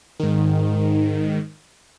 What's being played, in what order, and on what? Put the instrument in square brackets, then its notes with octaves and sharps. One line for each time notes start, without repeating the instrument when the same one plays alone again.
[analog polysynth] G#2 D#3